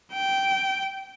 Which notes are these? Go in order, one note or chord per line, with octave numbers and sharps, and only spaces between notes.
G5